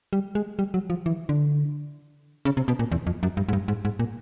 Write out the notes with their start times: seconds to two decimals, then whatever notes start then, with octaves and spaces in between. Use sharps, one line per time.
0.13 G3
0.35 G#3
0.59 G3
0.74 F#3
0.90 F3
1.06 E3
1.29 D3
2.45 C#3
2.57 C3
2.68 B2
2.79 A#2
2.92 E2
3.07 F2
3.23 F#2
3.37 G2
3.49 G#2
3.53 G2
3.68 G#2
3.85 G#2
3.99 A#2